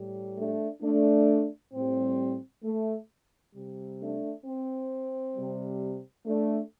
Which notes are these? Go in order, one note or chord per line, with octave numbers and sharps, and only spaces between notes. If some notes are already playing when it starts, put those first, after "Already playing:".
Already playing: A2 G3
A3 D4
A3 D4
A2 G3 C4
A3
C3 G3
A3 D4
C4
C3 G3
A3 D4